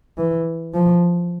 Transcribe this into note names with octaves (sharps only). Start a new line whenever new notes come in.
E3
F3